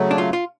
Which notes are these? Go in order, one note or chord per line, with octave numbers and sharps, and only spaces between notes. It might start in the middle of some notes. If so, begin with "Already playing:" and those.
Already playing: C#3 F#3 A3
D4
F4
F4